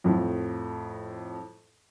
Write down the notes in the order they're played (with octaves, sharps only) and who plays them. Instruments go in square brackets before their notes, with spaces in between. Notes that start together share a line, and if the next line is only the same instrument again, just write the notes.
[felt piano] F2 A2 F3